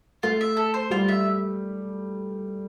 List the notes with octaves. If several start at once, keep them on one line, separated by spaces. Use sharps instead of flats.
A3 F4
E5
A4
C5
G3 F4
E5